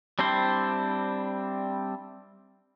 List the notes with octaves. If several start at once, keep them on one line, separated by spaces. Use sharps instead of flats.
G3 C4 D4 E4 C5